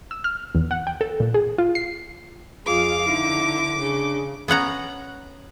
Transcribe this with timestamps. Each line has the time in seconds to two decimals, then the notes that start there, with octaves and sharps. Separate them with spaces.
0.11 E6
0.24 F6
0.55 E2
0.71 F#5
0.87 G5
1.01 A4
1.20 A#2
1.34 G#4
1.58 F4
1.75 C7
2.66 F2 F4 G#4 F5 D6
3.07 D3 D#4 E4
3.78 C#3 D4
4.48 B3 C#4 F#5 A#5